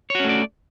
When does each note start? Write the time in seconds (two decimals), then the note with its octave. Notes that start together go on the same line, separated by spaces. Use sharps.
0.10 C#5
0.15 F#4
0.20 C#4
0.24 A3
0.29 D5